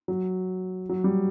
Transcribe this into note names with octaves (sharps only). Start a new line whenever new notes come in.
F#3
F#3
G3